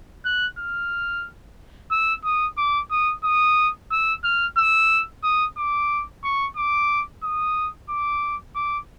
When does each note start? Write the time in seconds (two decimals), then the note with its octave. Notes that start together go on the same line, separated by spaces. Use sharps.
0.26 F#6
0.59 F6
1.91 E6
2.24 D#6
2.57 D6
2.91 D#6
3.24 D#6
3.91 E6
4.24 F6
4.57 E6
5.23 D#6
5.57 D6
6.24 C#6
6.57 D6
7.23 D#6
7.90 D6
8.55 D6